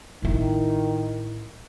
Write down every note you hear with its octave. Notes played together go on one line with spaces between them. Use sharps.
A1 D#3 E4